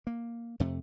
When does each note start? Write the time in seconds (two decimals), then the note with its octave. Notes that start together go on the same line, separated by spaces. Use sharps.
0.07 A#3
0.60 F2 C3 A3